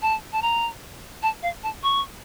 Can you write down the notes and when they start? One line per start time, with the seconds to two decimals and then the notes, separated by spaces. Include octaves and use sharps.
0.02 A5
0.33 A5
0.42 A#5
1.23 A5
1.42 F5
1.63 A5
1.83 C#6